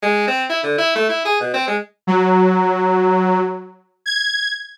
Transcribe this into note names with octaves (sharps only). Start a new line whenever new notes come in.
G#3
C4
E4
D3
E4
A3
E4
G#4
B2
C4
G#3
F#3
G#6